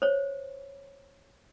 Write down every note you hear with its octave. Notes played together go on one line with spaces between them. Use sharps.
C5 C#5